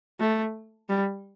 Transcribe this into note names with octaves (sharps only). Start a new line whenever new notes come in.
A3
G3